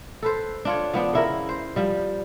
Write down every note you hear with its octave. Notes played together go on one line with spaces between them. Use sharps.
A4 B4 C5
D4 F4 C#5
F3 B3 D4
C#3 E4 A#4
C5
F3 G3